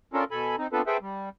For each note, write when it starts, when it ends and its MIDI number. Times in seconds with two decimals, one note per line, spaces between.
0.13 0.24 61
0.13 0.24 62
0.13 0.24 65
0.13 0.24 69
0.13 0.24 70
0.31 0.56 47
0.31 0.56 69
0.31 0.56 80
0.31 0.56 83
0.58 0.67 60
0.58 0.67 63
0.73 0.82 59
0.73 0.82 60
0.73 0.82 62
0.73 0.82 65
0.73 0.82 69
0.73 0.82 71
0.87 0.97 68
0.87 0.97 69
0.87 0.97 71
0.87 0.97 72
0.87 0.97 76
0.87 0.97 79
1.01 1.29 55